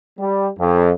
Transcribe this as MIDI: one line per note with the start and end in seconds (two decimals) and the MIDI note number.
0.19 0.48 55
0.58 0.91 41